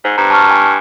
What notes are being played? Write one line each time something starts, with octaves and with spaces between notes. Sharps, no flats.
G#2 C5
G2 A#5
A5 C#6 F6
G#5